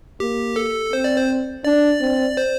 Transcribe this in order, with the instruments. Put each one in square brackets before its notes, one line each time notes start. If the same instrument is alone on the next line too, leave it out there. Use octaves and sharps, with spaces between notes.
[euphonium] A#3 [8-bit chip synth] G4
[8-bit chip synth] A4
[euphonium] C4 [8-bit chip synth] C5
[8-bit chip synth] D5
C5
[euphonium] D4 [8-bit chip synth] D5
[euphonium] C4
[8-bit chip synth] C5